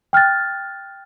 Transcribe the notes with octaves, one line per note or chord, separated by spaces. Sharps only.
G5 F6 F#6 A6